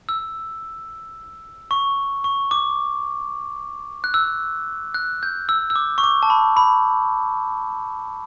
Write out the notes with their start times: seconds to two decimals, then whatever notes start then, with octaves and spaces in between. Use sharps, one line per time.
0.09 E6
1.71 C#6
2.24 C#6
2.51 D6
4.04 F#6
4.14 E6
4.94 F#6
5.23 G6
5.49 E6
5.70 E6
5.76 D6
5.98 C#6
6.04 D6
6.23 A5
6.30 B5
6.57 B5